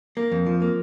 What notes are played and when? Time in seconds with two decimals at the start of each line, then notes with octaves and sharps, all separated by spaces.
0.17 A#3
0.32 F2
0.46 F3
0.62 A#3